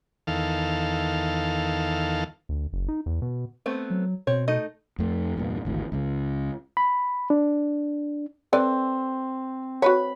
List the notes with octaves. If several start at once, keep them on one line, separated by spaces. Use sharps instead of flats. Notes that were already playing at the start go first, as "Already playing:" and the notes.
E2 D#3 A4 F5
D2
F#1
D#4
E2
B2
A3 B3 C4
F#3
B2 C4 C#5
A3 D#4 D#5
F2 A3
E2 G2 A#2
G#1 D2 E3
C#2 C#3
B5
D4
C4 A4 B4 D5
F#4 B4 C#5 B5